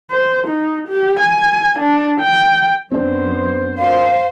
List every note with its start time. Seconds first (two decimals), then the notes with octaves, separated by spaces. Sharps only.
0.11 C5
0.48 D#4
0.88 G4
1.20 G#5
1.80 D4
2.21 G5
2.91 F#2 B3 C4 D4 C5
3.78 D2 A#2 C5 F5